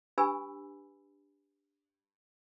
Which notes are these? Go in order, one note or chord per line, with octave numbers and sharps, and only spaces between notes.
D4 G4 B4 G#5 B5 E6